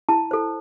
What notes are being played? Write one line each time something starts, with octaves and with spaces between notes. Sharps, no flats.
E4 A5
A4 C5